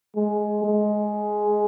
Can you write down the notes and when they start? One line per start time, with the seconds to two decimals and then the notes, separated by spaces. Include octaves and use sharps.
0.16 G#3
0.64 G#3